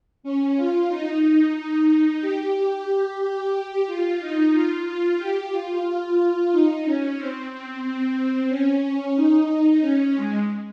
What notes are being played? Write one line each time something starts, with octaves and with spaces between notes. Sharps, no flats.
C#4
F4
D#4
D#4
D#4
G4
G4
F4
D#4
F4
F4
G4
F4
D#4
C#4
C4
C4
C4
C#4
D#4
C#4
G#3